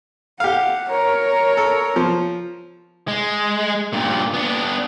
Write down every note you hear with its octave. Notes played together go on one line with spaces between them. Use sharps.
G4 F5 F#5
A#4 C#5
A4
F3
G#3
G2 A#2
B3 D4